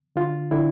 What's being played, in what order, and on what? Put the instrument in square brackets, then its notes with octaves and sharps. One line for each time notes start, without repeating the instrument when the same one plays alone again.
[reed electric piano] D3 F4
D3 E4